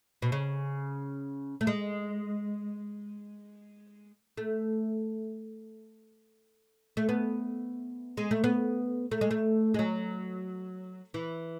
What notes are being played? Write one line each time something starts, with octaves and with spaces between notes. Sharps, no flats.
B2
C#3
A3
G#3
A3
A3
B3
G#3
A3
B3
A3
G#3
A3
G#3
F#3
E3